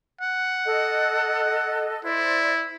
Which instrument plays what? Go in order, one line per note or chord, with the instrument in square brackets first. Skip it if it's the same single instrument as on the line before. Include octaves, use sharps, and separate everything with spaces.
[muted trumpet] F#5
[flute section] A4 D#5
[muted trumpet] E4 [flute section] C5 D5